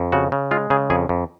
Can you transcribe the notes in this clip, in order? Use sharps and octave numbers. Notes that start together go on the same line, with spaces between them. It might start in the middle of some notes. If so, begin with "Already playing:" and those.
Already playing: F2
C#3 F#4
C#3
G#3 F4
C#3 G#4
F2 G#4
F2